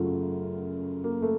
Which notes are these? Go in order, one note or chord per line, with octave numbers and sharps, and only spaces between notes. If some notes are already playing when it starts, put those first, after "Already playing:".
Already playing: F#2 C#3 F#3 A3 F4
A#3
A3